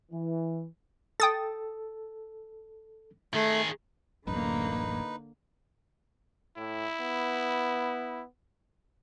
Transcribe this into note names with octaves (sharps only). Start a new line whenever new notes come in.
E3
A4 G5 D#6 A6
D#3 A3 G#4
D1 A1 F#2 D3 A#3 D#4 B4
A2 E4
B3